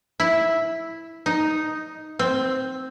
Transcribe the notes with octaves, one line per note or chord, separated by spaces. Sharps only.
E4
D#4
C4